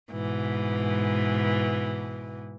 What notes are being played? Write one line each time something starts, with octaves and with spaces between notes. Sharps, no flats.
G#2 B2 E3